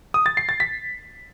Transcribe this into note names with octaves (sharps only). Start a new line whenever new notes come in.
D#6
A6
C7
A6
B6